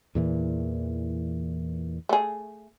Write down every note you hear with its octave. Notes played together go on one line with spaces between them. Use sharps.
E2 A#2 E3
A3 G#4